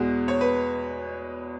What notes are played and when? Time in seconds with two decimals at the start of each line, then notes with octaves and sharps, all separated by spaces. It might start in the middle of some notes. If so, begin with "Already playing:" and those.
Already playing: E2 B2 G#3 F#4
0.28 C#5
0.41 B4